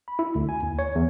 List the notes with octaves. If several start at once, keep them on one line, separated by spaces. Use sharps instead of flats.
B5
E4
D2
G#5
D#2
C#5
E2